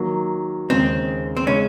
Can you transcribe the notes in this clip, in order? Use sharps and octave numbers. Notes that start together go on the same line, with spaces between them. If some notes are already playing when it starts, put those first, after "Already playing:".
Already playing: D#3 F#3 A#3
D#2 C#3 G#3 C4
C4
C#3 G#3 C#4